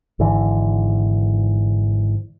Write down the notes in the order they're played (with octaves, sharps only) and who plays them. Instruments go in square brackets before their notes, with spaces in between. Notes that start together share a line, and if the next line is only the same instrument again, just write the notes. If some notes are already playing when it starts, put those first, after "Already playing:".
[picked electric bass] G#1 G#2 D3 E3